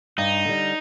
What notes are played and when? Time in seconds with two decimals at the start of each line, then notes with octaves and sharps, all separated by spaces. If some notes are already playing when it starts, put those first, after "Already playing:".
0.18 G2 D#4
0.45 D3 G3